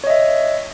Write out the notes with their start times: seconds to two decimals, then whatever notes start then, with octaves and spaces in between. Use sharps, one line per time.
0.04 C#5
0.07 D#5
0.10 E5